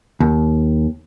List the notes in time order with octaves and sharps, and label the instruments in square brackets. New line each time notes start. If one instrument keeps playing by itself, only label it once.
[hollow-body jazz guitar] D#2